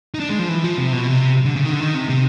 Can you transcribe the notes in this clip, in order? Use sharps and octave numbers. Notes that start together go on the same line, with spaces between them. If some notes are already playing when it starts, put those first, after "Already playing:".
D#4
D4
G#3
F3
E3
F3
C3
B2
C3
D3
C#3
D#3
D3
D#3
C3
C3